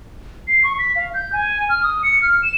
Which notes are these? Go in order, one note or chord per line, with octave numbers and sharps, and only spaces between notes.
C7
C#6
B6
F5
G6
G#5
F6
D#6
C#7
F6
E7